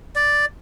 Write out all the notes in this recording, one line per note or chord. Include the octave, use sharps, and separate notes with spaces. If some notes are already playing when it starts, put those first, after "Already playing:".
D5